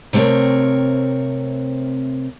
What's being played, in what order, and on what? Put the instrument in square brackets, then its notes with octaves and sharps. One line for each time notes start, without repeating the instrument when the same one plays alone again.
[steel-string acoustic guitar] C3 A3 C4 A#4 C#5